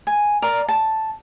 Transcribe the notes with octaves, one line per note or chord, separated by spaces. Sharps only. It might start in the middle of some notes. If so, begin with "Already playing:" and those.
G#5
A#4 D5
A5